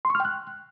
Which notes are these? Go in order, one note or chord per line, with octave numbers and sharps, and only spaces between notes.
C6
C#6
F6
G5
F#6